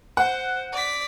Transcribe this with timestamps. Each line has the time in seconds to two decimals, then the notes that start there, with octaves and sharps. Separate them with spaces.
0.17 C5 F#5
0.72 D5 B6